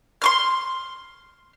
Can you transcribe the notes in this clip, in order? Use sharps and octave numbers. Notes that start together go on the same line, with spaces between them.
C6 C#6 F6